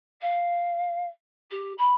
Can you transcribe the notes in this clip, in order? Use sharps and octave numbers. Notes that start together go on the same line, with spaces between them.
F5
G4
B5